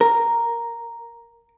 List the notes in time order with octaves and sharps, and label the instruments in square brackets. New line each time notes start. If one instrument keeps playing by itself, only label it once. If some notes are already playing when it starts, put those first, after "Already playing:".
[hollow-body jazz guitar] A#4